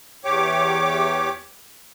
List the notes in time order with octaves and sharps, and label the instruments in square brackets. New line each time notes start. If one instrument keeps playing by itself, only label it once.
[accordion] E2 G4 C#5 D6